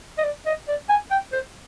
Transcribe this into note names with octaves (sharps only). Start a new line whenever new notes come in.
D#5
D5
D#5
D5
G#5
G5
C5